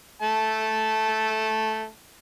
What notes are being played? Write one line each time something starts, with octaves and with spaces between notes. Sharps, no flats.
A3 A5